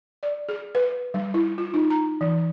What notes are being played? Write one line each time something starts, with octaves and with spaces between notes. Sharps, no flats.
D5
G#4
B4
G3
E4
F4
D#4
A#5
E3